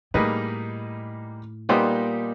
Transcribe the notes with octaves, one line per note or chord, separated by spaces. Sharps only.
A2 G3 A#3 D#4 G#4 B4
A#2 G3 B3 D#4 G4 C5